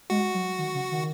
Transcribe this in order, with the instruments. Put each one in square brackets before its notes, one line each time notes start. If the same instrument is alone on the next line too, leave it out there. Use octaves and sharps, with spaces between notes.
[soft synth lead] G#3 [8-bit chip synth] F#4
[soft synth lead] F#3
D#3
C#3
D#3